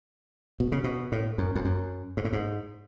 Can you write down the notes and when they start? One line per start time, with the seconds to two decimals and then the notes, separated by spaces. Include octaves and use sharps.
0.60 B2
0.72 C#3
0.84 B2
1.12 A2
1.38 F#2
1.56 F2
1.65 F#2
2.17 G#2
2.25 A2
2.33 G#2